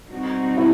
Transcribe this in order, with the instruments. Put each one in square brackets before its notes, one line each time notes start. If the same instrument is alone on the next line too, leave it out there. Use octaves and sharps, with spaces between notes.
[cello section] B2 G3 C4 D#4 F#4
[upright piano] E4